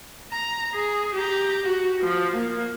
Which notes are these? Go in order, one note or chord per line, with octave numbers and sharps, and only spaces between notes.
A#5
G#4
G4 A#5
F#4
F3
A#3